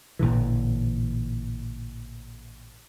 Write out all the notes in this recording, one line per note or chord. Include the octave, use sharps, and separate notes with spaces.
A1 A#2 D3 E3